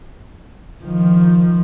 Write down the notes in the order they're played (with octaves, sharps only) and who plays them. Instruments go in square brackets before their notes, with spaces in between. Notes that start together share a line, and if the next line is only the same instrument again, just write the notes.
[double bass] D#3 F3